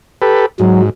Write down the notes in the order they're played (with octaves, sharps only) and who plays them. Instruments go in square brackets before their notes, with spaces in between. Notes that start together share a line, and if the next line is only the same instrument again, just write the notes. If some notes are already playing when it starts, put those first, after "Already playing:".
[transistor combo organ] G4 A4 B4
[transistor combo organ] G#2 [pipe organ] F#3